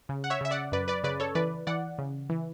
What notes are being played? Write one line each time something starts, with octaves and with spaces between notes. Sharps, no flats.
C#3
F#5
C#5 E5
C#3 E5
D5 F#5
F#2 B4 D5
B4 D5
C#3 B4 D5
A4 C#5
E3 B4 D5
E3 D5 F#5
C#3
E3